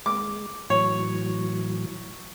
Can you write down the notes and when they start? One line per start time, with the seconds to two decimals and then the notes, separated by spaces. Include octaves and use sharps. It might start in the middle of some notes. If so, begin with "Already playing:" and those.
0.06 G#3 D6
0.70 A2 E3 F#3 C#5